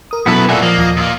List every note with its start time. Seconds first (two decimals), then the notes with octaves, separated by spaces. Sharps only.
0.11 A#4 D#6
0.26 B1 F#2 B2 F#3 B3 E4 A4 B4
0.49 A#2 F#4 A4 D5 E5 F#5 G#5
0.62 F3 A#3 D#5
0.78 D#2 F3 D#6
0.97 A#2 A#3